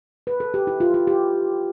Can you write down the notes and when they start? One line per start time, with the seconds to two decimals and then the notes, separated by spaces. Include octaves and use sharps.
0.27 B4
0.40 A4
0.54 G4
0.67 E4
0.80 F4
0.94 F4
1.07 G4